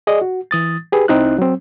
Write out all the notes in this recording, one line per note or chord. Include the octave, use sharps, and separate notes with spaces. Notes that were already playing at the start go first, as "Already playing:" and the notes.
G#4 D5 D#5
F#4
E3 D#6 A6
G4 G#4 B4
C2 C4 D#4 E4 F#6
F#3 C4